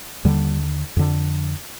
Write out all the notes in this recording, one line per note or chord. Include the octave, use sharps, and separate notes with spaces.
D#2 D3 G3
F2 D3